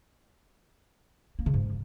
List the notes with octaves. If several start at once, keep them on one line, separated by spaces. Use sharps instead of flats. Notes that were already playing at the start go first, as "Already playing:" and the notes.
A#3
C#3
G#2